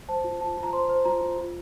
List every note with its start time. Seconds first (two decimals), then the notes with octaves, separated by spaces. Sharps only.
0.09 C5 A5
0.24 F4
0.40 F4 A5
0.57 F4
0.63 A#5
0.73 C5 C6
0.89 C5
1.05 F4 A#5
1.21 F4
1.38 F4